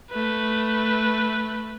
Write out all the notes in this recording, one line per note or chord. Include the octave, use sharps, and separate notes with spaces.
A3 B4